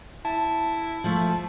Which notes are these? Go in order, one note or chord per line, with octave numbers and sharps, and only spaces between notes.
E4 A5
F3 A3